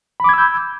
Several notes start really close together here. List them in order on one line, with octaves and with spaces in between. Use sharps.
B5 D6 G#6 E6 G6